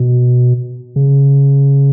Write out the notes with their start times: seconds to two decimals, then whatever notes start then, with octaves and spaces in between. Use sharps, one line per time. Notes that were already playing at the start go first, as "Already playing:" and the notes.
Already playing: B2
0.96 C#3